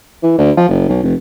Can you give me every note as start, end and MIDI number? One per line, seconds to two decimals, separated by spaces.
0.23 0.34 52
0.38 0.51 38
0.57 0.66 53
0.69 0.85 30
0.89 0.99 35
1.03 1.14 29